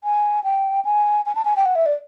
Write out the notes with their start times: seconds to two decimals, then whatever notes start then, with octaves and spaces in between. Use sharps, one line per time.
0.04 G#5
0.44 G5
0.85 G#5
1.26 G#5
1.35 A5
1.45 G#5
1.56 G5
1.65 F#5
1.75 E5
1.86 D5